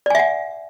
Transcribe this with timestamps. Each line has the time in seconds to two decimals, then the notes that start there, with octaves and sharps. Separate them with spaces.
0.06 D5
0.10 G#5
0.15 E5
0.19 F#5